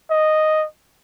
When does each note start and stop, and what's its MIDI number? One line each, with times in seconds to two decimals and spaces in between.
0.10 0.66 75